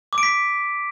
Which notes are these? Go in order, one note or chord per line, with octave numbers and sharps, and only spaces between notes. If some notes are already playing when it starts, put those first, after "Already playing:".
D6
D7
B6